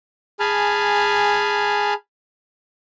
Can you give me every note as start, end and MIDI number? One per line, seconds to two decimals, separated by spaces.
0.40 1.94 68
0.40 1.94 80
0.40 1.94 81
0.40 1.94 83
0.40 1.94 89